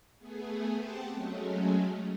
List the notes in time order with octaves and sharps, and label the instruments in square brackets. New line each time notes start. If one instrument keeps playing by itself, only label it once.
[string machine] A3 B3 G#4
C4 G4 C5 F#5 G5 A5
F#3 G#3 A3 C#4